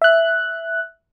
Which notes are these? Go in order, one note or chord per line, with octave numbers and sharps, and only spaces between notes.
E5 F#6